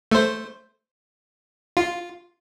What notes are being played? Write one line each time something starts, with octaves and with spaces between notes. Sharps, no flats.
A3 C5
F4